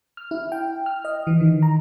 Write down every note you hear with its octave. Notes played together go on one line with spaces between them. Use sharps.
F6
E4
G5
F6
D#5
E3
D#3
A#5